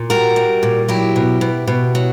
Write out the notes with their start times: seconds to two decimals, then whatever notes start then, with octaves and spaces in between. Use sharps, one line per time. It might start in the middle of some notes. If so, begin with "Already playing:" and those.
Already playing: A#2
0.10 G3 F#4 A#4
0.36 G3
0.63 A#2
0.89 F#3 E4 G4
1.16 B2
1.41 B2
1.68 B2
1.95 F#3